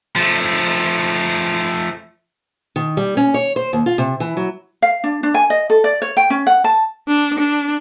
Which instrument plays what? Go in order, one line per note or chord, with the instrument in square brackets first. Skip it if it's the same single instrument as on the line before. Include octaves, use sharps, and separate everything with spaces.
[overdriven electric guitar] F3 A3
[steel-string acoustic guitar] D#3
G3
C#4
C#5
C5
D#2
F4
C3
E3
F#3
[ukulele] F5
D4
D4
G#5
D#5
A4
D5
C#5
G5
C#4
F#5
A5
[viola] D4
D4